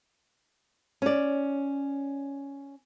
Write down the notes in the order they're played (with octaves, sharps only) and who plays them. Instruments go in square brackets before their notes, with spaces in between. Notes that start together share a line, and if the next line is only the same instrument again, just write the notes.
[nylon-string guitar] C#4 D5